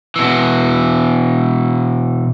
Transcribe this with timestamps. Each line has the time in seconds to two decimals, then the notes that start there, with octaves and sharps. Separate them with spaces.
0.16 B2 E3